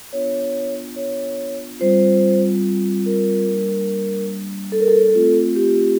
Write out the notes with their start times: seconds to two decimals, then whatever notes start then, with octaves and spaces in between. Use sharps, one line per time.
0.13 B3 D4 F4 C#5
0.96 C#5
1.80 G3 C4 F4 C5
3.06 A#4
3.47 G3 A#3 D4
4.72 A4
4.80 A#4
4.88 A4
5.15 A3 C4 F4
5.55 G4